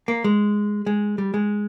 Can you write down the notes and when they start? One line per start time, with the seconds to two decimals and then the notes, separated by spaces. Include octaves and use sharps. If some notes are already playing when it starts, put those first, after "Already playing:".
0.08 A#3
0.24 G#3
0.86 G#3
1.18 G3
1.34 G#3